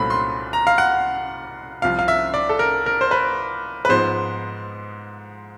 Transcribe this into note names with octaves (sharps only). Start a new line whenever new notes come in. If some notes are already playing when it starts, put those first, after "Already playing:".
Already playing: C2 A#2 F#3 A3 C4 B5
C6
A#5
F5
F#5
C2 C3 F3 F5
F5
E5
D5
A4
A#4
A#4
C5
B4
B4
G#2 F3 G#3 B3 C5